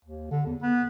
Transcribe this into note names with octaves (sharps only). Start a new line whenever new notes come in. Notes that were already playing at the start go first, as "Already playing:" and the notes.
D#2
D3
E2
B3